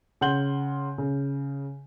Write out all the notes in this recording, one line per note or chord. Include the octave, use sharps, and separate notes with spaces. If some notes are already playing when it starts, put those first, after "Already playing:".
C#3 F#5 C6 G6 F#7 G7
C#3